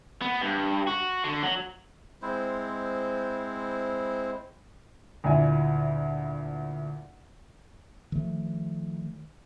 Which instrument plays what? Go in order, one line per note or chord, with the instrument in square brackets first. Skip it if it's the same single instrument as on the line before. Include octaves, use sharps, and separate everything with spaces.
[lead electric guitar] B3
G2
F#4
D3
F#3
[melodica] G#3 C4 E4 C5
[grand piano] D2 A#2 E4 G#5
[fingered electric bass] D#3 F3 A3